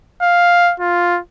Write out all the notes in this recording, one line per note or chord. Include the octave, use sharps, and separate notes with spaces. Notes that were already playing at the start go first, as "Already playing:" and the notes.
F5
F4